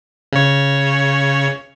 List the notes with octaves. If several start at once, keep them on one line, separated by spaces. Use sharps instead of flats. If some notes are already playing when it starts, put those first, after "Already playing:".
C#3 C#5